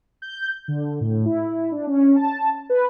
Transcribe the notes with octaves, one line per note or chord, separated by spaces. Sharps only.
G6
D3
A2
E4
D4
C#4
A5
B4